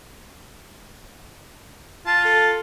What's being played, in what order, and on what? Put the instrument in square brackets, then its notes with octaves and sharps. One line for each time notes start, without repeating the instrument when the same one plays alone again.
[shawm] F4 [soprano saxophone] A5
[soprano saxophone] A4